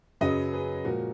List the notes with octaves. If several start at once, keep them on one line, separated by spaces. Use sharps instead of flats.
F#2 C#3 F#3 B4 D#5
G#4 B4
A#2 F3 G#3 F#4 A#4